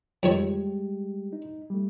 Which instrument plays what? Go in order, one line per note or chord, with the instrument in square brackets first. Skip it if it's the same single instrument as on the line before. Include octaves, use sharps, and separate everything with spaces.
[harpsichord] F2 D#3 C#5 [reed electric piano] G3 G#3 G4
[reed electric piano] D#4
G3 A3